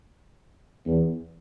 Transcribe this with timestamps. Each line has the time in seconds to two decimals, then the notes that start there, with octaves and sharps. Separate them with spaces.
0.86 E2